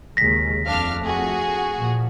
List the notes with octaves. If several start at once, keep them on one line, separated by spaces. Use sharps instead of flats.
D#2 C#3 G#3 A#6 B6
F2 A3 D4 F5 F6
F#4 G#4
A#2 F3